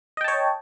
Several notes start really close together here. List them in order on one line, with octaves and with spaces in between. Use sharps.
D#5 G5 A5 C#5